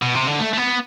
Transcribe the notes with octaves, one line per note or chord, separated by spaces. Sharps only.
B2
C3
D3
A3
A3
B3